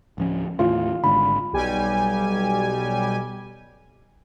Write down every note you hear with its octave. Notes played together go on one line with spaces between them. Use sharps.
D1 F3 C#4
D#2 A2 E3 F4
G#1 G#2 D3 B5
B1 G3 G4 G#5